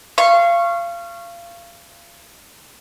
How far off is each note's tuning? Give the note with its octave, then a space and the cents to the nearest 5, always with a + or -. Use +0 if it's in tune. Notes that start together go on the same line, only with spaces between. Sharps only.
F5 -25 C#6 -10